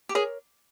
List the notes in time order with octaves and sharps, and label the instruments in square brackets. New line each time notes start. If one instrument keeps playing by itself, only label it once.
[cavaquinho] G4
[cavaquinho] G#4 [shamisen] A#4 C#5